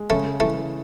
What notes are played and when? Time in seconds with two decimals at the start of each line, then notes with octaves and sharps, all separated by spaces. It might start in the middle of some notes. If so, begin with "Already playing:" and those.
Already playing: G#3
0.10 C#3 A3
0.40 E3 A3